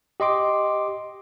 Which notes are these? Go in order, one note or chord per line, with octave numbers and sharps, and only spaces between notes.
G4 D#5 C6 D6